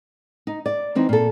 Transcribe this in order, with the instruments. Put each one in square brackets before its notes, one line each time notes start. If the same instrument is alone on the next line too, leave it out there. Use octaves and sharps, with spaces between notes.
[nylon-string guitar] D#4
D5
E3 C4 D#4
A#2 A4